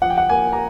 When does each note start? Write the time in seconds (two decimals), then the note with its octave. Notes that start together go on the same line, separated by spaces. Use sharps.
0.02 F3 F#5
0.10 G5
0.18 F#5
0.29 A#3 G#5
0.53 A#5